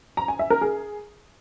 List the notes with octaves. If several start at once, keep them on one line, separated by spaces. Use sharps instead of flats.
A#5
G#5
E5
A#4
G#4